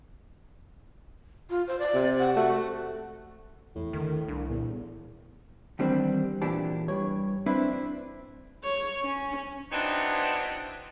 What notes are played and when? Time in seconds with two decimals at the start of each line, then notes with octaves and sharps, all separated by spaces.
1.50 F4
1.67 C5
1.79 D5
1.94 C3
2.19 F#5
2.36 A3 F#4
3.76 E2 A2
3.93 D#2 D3 D#3
4.28 C2 D4
4.50 E2 A#2
5.79 D#3 E3 G3 B3 C4 D4
6.42 E2 A#2 E3 D4 G4 A5
6.88 G2 C#5
7.46 C4 D4 E4 B4
8.64 C#5
9.03 C#4
9.72 E3 F#3 B3 C4 D4 D#4